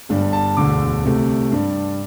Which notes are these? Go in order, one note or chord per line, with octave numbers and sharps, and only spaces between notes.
G1 G2 G3 D4
A5
E1 D2 D3 D6
C2 C3 A3
G2 G3 D4